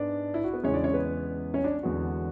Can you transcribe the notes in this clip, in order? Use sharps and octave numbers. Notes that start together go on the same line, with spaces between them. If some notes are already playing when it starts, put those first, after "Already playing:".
Already playing: G#2 G#3 B3 D4 D5
E4
F#4
B3 B4
E2 C#3 E3 G#3 C#4 C#5
D4 D5
C#4 C#5
B3 B4
C#4 C#5
D4 D5
E2 D3 G#3 B3 F#4